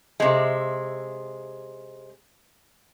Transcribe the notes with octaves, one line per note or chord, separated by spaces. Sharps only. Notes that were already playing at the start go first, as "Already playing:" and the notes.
C3 G#3